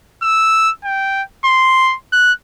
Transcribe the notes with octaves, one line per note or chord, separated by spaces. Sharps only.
E6
G5
C6
F#6